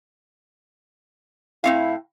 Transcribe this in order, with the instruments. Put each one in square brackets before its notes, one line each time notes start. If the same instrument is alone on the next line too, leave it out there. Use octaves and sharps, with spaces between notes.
[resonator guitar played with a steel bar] A2 C4 F5 [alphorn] E4